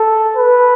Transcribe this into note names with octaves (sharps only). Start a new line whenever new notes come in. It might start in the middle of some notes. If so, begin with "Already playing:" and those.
Already playing: A4
B4